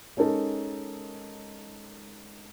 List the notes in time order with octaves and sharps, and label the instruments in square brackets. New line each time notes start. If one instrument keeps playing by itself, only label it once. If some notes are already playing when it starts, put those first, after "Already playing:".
[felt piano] G#3 C#4 D#4 A4 A#4